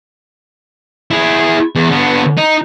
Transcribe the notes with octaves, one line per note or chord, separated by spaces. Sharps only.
E4 G#4
E2
D3 B3
D#4